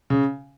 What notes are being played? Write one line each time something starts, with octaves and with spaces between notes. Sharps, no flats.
C#3